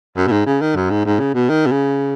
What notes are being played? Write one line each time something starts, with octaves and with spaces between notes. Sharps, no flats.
F#2
B2
G#2
C#3
D#3
F#2
G#2
G#2
C#3
B2
D#3
B2
C#3